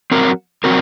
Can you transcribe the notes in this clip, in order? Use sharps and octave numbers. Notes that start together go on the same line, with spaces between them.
F#3 C4 F#4 A#4
F#3 C4 F#4 A#4